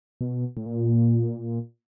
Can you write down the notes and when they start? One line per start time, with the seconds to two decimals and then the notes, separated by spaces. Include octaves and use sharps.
0.21 B2
0.57 A2
0.66 A#2